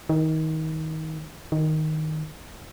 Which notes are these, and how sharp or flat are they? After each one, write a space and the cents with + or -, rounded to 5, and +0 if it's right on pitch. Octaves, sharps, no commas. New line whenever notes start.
D#3 +25
D#3 +0